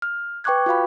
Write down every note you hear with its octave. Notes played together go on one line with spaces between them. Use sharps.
F6
B4 G5 C#6 D6 F#6 G#6
F4 F#4 F5 B5